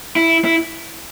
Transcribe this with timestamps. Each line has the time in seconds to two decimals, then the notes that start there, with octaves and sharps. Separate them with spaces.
0.16 E4
0.45 E4